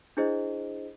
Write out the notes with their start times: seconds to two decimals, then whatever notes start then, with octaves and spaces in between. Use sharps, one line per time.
0.17 D4 E4 G#4 C5 D#5